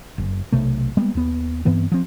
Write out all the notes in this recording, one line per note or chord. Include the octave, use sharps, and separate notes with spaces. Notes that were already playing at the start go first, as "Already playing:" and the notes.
F#1
B1 C3 A3
G3 G#3 A#3 B3
D#2 B3
G2 E3 B3 C4
F3 C4